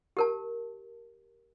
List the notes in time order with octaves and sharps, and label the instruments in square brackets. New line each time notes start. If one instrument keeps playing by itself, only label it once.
[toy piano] G4 A#4 A5